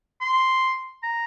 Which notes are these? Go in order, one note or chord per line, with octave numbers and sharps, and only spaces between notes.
C6
A#5